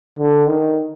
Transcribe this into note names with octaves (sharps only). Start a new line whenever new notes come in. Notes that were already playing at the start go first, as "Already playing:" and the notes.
D3
D#3